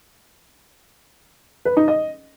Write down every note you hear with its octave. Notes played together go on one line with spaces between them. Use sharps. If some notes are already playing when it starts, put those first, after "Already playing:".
B4
D#4
D#5